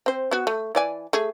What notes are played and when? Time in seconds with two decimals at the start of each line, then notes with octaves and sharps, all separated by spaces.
0.06 C4 C5
0.31 B3 F#4
0.47 A3
0.75 E3 D5 G#5
1.13 A3 G#4